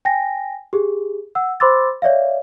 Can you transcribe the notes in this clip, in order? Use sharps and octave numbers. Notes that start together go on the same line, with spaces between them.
G5 G#5 A#6
G4 G#4
F#5 E6
C5 B5 C6 D6 E6 A6
C#5 D5 E5 F5